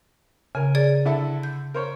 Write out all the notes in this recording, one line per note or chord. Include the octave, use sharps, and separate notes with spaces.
C#3 A#4 G#5
G#4 D5 A6
D3 E4 A4
G6
A#4 C5 C#5